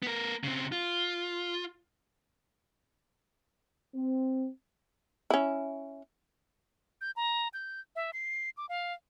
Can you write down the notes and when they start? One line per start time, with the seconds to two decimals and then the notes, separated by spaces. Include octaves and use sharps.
0.03 B3 A#4
0.44 C#3 C4
0.72 F4
3.95 C4
5.30 C#4 E4
7.01 G6
7.16 A#5
7.54 G6
7.96 E5
8.13 C7
8.57 D6
8.69 F5